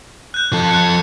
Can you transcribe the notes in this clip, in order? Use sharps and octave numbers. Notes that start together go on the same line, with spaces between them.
F#6 G6
F3 A4
F#6 C#7